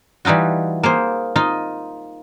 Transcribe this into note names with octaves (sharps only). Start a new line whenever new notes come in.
E3 G3 D#4 F4 F#4
A#3 G#4 C5
D#4 F4 D#5